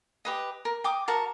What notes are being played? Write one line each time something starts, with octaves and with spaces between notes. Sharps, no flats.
G4 B4 D#5
A#4
G5 D6 D#6
F#4 A#4 A5 A#5